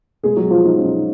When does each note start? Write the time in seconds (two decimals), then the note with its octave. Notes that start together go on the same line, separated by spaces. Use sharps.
0.23 B2 G#3 G#4
0.36 F#3 F#4
0.50 F3 F4
0.64 B2 D#4
0.78 C#4
0.85 D#4